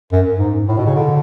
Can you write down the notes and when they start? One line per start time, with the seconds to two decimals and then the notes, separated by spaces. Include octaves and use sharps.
0.12 F#2
0.39 G#2
0.68 A2
0.77 B2
0.86 C#3
0.95 D3